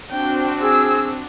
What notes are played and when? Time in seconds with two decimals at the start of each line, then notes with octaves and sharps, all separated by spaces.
0.11 C4 D4 F#4 G5
0.61 G#4 E6